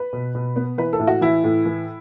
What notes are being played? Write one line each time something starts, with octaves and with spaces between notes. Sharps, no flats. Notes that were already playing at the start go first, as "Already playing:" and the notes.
Already playing: B4
B2
B2
B3
E3 B4
A4
A2
F#4
E3 E4
A2
E3